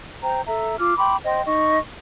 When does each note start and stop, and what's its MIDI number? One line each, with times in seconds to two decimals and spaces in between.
0.22 0.40 72
0.22 0.40 79
0.22 0.40 82
0.46 0.78 69
0.46 0.78 76
0.46 0.78 82
0.79 0.94 65
0.79 0.94 86
0.79 0.94 89
0.97 1.16 79
0.97 1.16 83
0.97 1.16 84
0.97 1.16 86
1.25 1.42 72
1.25 1.42 75
1.25 1.42 79
1.25 1.42 84
1.45 1.79 63
1.45 1.79 75
1.45 1.79 85